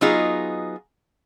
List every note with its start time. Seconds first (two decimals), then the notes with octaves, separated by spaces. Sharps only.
0.01 F#3 B3 D#4 F4 G#4